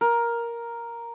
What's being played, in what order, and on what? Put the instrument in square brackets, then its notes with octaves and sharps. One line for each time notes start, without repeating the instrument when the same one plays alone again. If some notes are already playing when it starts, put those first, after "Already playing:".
[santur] A#4